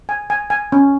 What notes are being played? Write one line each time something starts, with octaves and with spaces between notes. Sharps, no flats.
G#5
G#5
G#5
C#4